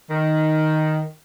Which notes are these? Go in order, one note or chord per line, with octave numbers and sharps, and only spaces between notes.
D#3